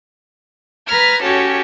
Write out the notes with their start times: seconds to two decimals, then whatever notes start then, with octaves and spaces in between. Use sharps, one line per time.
0.87 B4 A#5 B5 F6 G#6
1.23 C#4 F#4 G4 A4 C#5